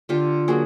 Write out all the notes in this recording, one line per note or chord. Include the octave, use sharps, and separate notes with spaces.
D3 F4 G4
F#3 A#3 F#4 G#4